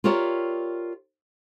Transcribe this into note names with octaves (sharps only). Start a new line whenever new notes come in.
F4 G4 A#4 C#5 D5 E5